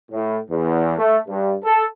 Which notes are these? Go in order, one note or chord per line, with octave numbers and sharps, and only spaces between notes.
A2
E2
A3
G2
A4